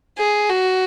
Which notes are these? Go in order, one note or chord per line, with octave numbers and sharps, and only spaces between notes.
G#4
F#4